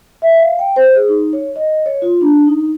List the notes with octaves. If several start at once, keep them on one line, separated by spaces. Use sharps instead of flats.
E5
F5
G5
C5
G#4
D#4
C#5
D#5
C#5
F4
D4
D#4